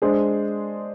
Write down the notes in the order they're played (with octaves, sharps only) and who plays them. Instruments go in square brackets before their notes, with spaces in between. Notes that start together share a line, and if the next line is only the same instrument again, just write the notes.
[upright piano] G#3 D4 G#4 C5